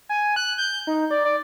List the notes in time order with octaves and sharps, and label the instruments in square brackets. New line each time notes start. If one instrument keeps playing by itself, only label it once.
[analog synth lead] G#5
F#6
G6
D#4
D5
D5